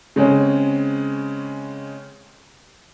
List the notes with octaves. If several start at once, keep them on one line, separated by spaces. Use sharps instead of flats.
C#3 G#3 C4 C#4